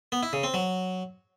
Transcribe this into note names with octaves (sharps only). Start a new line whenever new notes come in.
B3
E4
C#3
C4
F#3